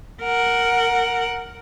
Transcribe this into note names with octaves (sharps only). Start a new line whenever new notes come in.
A#4 F#5